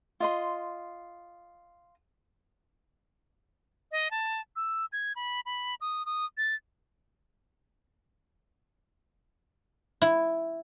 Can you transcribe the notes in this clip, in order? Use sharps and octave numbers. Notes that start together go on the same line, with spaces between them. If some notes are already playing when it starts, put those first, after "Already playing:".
F4 D#5 C6
D#5
A5
E6
G#6
B5
B5
D#6
D#6
A6
E4